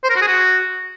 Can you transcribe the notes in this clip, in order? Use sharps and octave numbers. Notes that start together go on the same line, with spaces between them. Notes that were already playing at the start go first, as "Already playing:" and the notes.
C5
A#4
F#4
G#4
F#4